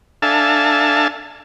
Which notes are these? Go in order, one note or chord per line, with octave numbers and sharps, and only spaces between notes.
D4 A4 E5 F5 G#5 A5